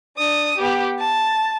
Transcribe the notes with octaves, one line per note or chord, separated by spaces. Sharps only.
D4 D#6
B3 G4
A5